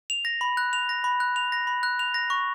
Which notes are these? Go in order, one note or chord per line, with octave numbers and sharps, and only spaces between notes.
F7
A#6
B5
F#6
F7
A#6
B5
F#6
F7
A#6
B5
F#6
F7
A#6
C#6